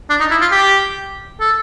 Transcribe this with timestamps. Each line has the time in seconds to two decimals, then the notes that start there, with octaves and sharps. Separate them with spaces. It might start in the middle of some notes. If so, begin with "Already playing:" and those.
0.10 D4
0.20 D#4
0.31 E4
0.42 F4
0.52 G4
1.41 A4